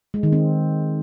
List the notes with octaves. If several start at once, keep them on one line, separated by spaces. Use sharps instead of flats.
G#3
D#3
C4